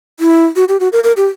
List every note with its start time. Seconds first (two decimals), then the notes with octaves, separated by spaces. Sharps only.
0.20 E4
0.56 F#4
0.68 G4
0.80 F#4
0.93 A#4
1.04 A#4
1.17 G4